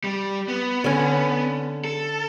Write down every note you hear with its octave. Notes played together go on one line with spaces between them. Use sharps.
G3
B3
D3 C#4
A4